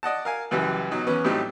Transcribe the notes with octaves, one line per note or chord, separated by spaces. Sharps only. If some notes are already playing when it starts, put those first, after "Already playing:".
D5 D#5 F#5 A5
A#4 F5 G#5
C#2 F#2 E3 G3
B2 F#3 D#4
E2 B3 C#4 B4
A2 F#3 G3 C4 D#4 G4